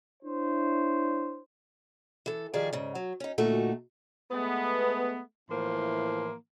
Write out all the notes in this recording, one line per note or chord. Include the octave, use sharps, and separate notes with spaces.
D4 E4 C5 C#5
E3 A4
D#3 F3 G3 G#4 D5
G#2 C#3
F#3
C#4 D#4
D2 A#2 A3 D#4 F#4
G#3 A3 B3
A2 E3 F3 A#3 C6